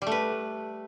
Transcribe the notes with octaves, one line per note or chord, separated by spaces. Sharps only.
G3 A3 B4